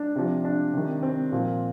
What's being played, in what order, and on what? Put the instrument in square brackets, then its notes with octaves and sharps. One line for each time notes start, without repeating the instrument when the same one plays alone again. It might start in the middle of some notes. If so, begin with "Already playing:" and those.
Already playing: [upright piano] D4
C3 F3
D4
C3 D#3
C4
A#2 F3